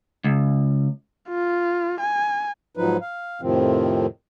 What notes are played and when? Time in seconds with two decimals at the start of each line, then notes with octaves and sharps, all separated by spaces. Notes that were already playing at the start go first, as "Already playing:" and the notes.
0.24 C#2
1.30 F4
2.00 G#5
2.77 G#2 F3 F#3 D#4 B4
3.01 F5
3.42 F2 A2 C3 D#3 F3 C4